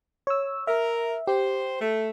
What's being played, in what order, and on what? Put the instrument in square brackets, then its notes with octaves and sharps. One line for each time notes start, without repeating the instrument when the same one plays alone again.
[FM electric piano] C#5 E6
[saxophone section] A#4 [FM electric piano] E5
[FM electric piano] G4 [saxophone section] C5
[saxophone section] A3